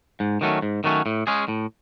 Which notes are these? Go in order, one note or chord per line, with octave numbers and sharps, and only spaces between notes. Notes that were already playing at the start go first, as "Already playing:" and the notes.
G#2
D#3 F#3 A3 C#4
G#2
D#3 F#3 A3 C#4
A2
G#3 C#4 G#4
A2